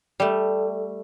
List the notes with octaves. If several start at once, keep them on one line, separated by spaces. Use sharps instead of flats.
G3 A3